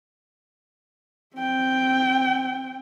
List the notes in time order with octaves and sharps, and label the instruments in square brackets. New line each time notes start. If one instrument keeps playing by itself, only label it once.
[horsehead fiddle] C4 G5